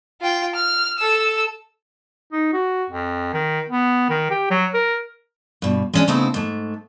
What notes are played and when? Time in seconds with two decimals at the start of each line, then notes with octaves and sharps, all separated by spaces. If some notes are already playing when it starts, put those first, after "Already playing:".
0.21 F4 G5
0.56 F6
0.98 A4 E6
2.32 D#4
2.53 F#4
2.90 F2
3.33 D#3
3.69 B3
4.09 D#3
4.31 G4
4.51 F#3
4.74 A#4
5.62 G2 B2
5.94 G#3 C#4 D4
6.08 C#3 A3 B3 C4 D#4 E4
6.34 G#2 A3